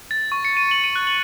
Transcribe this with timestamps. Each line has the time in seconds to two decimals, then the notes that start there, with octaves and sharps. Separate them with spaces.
0.11 A6
0.32 C#6
0.45 C#7
0.57 D#7
0.71 F#7
0.84 D#7
0.96 F#6
1.07 F#7